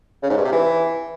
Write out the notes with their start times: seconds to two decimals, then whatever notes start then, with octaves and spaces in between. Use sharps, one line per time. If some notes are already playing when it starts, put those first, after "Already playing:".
0.23 C#3
0.30 G#2
0.37 G2
0.45 C3
0.52 E3